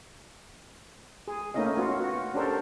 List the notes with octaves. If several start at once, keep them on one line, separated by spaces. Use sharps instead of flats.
G#4
A3 A#3 C#4 D#4 E4 D#5
B3 C#4 F4 F#4
F#4
C#4 D4 G4 A4 A#4 C5